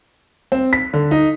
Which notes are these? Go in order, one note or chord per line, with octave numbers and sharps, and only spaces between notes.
C4
B6
D3
D#4